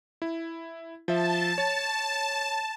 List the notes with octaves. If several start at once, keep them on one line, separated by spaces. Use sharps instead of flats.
E4
F3 E5 A5
C#5